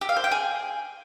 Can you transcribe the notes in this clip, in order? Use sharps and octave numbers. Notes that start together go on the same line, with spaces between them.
G4
F5
C5
G5
G#4